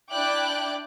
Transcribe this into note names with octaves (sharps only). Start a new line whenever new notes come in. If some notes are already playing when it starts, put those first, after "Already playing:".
D4 E4 D5 G5 D6 F#6